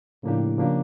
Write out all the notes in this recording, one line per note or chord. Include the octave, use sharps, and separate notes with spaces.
A2 C#3 F3 A#3 D4 G4
C#3 F3 A#3 D4 G4